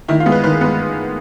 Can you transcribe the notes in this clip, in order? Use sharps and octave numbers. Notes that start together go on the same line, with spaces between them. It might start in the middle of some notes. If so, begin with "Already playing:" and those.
D#3 E4
F4
G#3 B3
B4
D#3 B4
G#3 B3